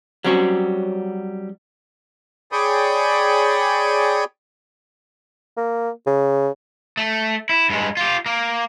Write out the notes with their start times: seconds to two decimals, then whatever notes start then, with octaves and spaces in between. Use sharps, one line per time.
0.24 F#3 G3 C4 C#4 F#4
2.52 G#4 C#5 D5 G5 B5 D#6
5.57 A#3
6.07 C#3
6.97 A3
7.49 E4
7.70 G2 G#3
7.97 F4 G4
8.26 A#3